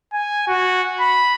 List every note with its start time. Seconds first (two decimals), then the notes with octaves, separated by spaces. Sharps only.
0.13 G#5
0.48 F#4
1.00 B5